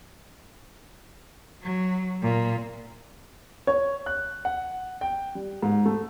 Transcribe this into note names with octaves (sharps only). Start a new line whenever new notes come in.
F#3
A#2
C#5
F#6
F#5
G5
G3
G#2
A3